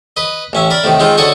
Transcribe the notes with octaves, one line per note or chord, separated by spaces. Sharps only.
B4 D#5
A1 C#4 E5
A#4 D5 B5
A2 C3 D#3
D#3 G#3 C4 D#4 F4
D3 F#4 A4 C#5 D#5 C#6